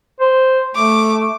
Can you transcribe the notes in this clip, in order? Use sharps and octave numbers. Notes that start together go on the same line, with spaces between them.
C5
A3 D6